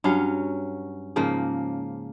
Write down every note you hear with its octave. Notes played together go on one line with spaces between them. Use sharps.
G2 F#3 C#4 F5
G#2 C#3 F3 A#3